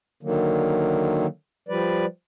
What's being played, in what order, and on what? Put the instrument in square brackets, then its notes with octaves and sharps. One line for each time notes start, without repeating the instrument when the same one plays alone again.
[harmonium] D3 D#3 F#3 A#3
F3 G3 B4 D5